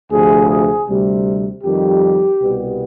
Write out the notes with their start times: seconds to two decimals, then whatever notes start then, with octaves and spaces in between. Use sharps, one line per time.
0.11 D2 C3 F3 G#4
0.49 G#4
0.87 D2 C3 G3
1.63 F2 D#3 G3 G4
2.41 C2 B2 G3 B3